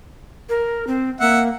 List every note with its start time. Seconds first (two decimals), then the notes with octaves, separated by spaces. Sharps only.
0.49 A#4
0.87 C4
1.20 A#3 E5 F#5